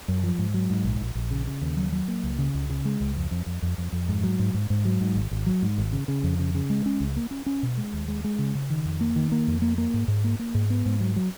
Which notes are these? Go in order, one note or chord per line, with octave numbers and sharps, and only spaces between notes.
F#2
F3
G#2
F#3
G#2
A#1
A#1
A#1
C#3
C#3
D#2
F#3
F#3
A#3
C#2
C#3
C#2
C#3
G#3
C#2
F2
F2
F2
F2
F2
F2
G#2
F#3
G#2
G#2
G#2
F#3
G#2
G#1
G#1
F#3
G#2
G#1
C#3
C#3
F2
C#3
C#3
G#3
C#4
C#2
A#3
C#4
C#4
B2
G#3
D#2
G#3
G#3
C#3
C#3
D#3
F2
A#3
D#3
A#3
F2
A#3
A#3
G#2
G#2
A#3
A#3
G#2
B3
G#2
F#3
F#3